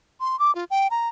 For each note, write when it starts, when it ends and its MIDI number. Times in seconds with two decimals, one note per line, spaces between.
0.20 0.38 84
0.39 0.54 86
0.55 0.64 65
0.70 0.88 79
0.91 1.09 82